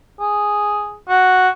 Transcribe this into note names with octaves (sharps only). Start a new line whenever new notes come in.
G#4
F#4